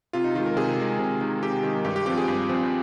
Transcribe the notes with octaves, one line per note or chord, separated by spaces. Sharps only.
C3 F4
D#4
D#3 G#3 F4
A#4
C3 G#4
D#3 G#3
C3
D#3 G#3
C3 G4
D#3 G#3
G2 G4
G4
F3 C4 G4
G#4
G2
F3 C4